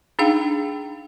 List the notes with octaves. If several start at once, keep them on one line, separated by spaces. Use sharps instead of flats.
D4 D#4 G#4 F5 G5